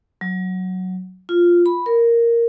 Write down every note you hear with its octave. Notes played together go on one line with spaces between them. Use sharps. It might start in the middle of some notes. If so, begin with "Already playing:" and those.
F#3
F4
B5
A#4